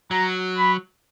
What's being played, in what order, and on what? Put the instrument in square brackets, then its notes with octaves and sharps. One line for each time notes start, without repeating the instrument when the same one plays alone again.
[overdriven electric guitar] F#3 [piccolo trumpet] A#5
[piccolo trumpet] B5